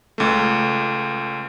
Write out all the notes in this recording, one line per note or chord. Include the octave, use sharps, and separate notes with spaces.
C#2 A3